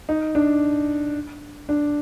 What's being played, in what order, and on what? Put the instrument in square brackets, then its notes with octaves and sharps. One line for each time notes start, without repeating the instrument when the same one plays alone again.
[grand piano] D#4
D4
D4